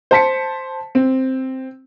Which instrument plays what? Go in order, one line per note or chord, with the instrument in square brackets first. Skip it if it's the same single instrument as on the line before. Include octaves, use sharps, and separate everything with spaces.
[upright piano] C5 A5 B6 C#7
C4